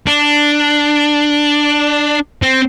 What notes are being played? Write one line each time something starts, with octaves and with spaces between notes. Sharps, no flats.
D4
C4